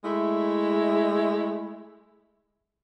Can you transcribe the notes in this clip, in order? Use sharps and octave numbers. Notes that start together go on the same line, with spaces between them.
G#3 A3 E4